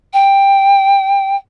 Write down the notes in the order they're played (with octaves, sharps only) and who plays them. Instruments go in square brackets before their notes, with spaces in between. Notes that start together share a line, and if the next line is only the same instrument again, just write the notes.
[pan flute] G5